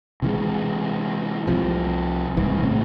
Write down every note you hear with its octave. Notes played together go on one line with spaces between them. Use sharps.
C3 E3 G#3
C2 C3 F3
C2 G#2 E3
C2 A2 C#3 C4